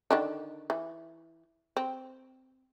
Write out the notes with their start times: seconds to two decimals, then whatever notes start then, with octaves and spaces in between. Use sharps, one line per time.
0.11 D3 D#3 D4
0.70 E3
1.77 C4